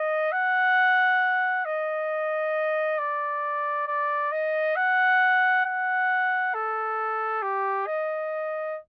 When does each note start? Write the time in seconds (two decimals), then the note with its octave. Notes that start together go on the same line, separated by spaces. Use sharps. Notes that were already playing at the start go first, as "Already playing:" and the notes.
Already playing: D#5
0.32 F#5
1.65 D#5
2.99 D5
3.87 D5
4.32 D#5
4.76 F#5
5.65 F#5
6.54 A4
7.42 G4
7.87 D#5